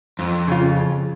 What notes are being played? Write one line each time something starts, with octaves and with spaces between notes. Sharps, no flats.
F2
C#3 F4